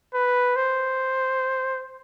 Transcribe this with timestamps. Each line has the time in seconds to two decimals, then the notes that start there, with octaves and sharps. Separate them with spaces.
0.14 B4
0.56 C5